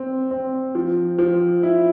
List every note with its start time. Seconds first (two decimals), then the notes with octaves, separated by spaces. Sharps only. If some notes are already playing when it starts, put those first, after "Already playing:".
Already playing: C4
0.31 C4
0.75 F3
1.19 F3
1.63 E4